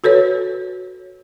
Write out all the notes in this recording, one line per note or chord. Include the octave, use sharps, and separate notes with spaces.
F#4 A4 B4 C#5